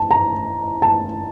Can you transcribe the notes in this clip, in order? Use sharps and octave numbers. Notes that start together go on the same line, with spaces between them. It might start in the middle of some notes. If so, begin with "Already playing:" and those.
Already playing: A5
A#5
A5